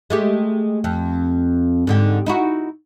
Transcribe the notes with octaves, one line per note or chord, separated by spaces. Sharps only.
G#3 A3 G4
F2
G#2 D3 G4
D#4 E4 F#4